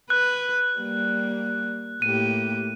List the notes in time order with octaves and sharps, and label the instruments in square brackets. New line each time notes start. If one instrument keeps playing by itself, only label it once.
[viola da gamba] B4 [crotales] F#6
[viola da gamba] G3 A#3
[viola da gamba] A2 A#3 G4 [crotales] D#7